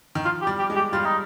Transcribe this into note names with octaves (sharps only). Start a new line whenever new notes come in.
D#3
F3 F4
G4
G3
G4
G#3
G4
G3 F4
D#4